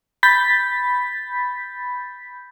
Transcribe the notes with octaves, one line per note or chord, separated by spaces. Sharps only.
B5 G6 A6 B6